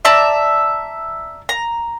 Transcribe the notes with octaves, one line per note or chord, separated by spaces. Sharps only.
D5 E5 A5 A#5
A#5